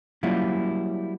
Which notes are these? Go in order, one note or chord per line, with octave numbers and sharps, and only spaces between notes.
F#3 G3 A#3 C#4 E4 F4